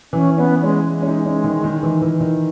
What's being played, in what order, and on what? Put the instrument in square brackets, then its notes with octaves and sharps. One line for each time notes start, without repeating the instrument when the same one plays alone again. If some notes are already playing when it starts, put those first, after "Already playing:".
[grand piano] E3 [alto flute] C#4
[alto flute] B3 [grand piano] C#4
[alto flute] G#3 [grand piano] C#4
[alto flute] G#3
[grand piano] C#4
D#4
C#4
D#3
D#3
E3
E3
D#3